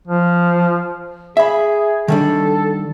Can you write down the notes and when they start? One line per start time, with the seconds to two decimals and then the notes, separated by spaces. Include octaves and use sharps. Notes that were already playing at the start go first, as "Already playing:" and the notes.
0.07 F3
1.37 G#4 E5 B5
2.08 D#3 G3 D4 A4